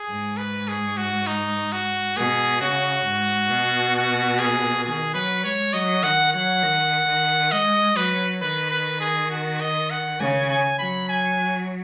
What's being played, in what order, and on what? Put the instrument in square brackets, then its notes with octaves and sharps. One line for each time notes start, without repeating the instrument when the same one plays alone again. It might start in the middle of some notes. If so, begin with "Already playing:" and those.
Already playing: [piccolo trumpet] G#4
[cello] G#2
[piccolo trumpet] B4
G#4
F#4
D#4
F#4
[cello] B2 [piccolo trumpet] G#4
[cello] C#3 [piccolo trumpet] F#4
[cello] G#2
B2
[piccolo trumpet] F#4
G#4
[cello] D#3 [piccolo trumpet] G#4
[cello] F#3 [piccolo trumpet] B4
[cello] G#3 [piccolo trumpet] C#5
[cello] F#3 [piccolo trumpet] D#5
[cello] D#3 [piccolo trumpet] F#5
[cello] F#3 [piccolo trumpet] F#5
[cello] D#3
D#3
[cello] G#3 [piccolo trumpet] D#5
[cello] F#3 [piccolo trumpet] B4
[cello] D#3 [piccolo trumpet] B4
[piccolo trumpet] B4
G#4
F#4
D#5
F#5
[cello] C#3 [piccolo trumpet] G#5
[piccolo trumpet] G#5
[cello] F#3 [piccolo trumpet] B5
[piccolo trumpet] G#5